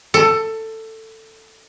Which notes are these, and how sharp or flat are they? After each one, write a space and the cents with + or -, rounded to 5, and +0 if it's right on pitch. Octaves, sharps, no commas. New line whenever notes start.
A4 +15